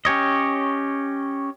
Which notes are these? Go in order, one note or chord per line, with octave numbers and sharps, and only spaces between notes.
C#4 G4 C#5 D#5